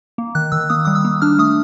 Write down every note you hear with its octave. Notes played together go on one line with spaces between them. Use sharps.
A#3
D#3 F#6
D#3 E6
A#3 D#6
G3 D#6
E6
A#3
D4 F6
A3 D#6